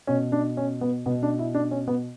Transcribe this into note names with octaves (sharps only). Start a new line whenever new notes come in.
B2 C#4
D4
C#4
B3
B2 B3
D4
E4
D4
C#4
B3